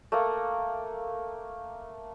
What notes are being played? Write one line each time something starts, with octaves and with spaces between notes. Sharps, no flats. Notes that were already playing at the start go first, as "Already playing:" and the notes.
A3 A#3